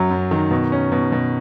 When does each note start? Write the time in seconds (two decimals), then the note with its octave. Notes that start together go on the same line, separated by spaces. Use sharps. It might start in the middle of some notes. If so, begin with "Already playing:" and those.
Already playing: F#2 F#3
0.10 F#2
0.31 D#3
0.51 B2
0.72 C#4
0.92 B2
1.12 B2